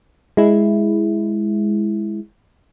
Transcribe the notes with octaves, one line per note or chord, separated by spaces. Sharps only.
G#3 E4